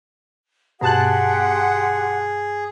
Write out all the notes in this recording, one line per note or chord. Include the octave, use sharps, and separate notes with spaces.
G2 B2 G4 G#4 F#5 A5 C6 F#6